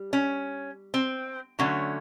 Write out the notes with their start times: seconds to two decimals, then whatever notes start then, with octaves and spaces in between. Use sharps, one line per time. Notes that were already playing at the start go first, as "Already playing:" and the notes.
Already playing: G3
0.13 C#4
0.94 C4
1.59 D3 F#3 A3 C#4